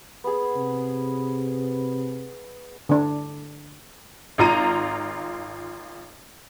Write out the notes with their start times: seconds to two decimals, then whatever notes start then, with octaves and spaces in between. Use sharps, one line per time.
0.24 B3 G#4
0.56 C3
2.89 D3 D4
4.38 G#1 F4 A#5 D#7